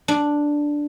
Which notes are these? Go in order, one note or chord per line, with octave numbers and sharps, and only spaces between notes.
D4